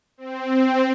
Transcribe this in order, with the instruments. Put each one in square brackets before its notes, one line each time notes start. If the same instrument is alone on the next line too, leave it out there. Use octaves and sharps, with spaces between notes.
[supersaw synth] C4